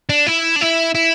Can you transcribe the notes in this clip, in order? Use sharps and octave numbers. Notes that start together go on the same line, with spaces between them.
D4
E4
D4
E4
E4